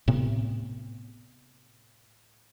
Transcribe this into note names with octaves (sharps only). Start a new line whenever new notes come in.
A2 C3 B3